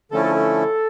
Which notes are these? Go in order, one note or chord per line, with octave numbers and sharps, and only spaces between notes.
D3 F3 A3 C#4 E4 A4
A4
A4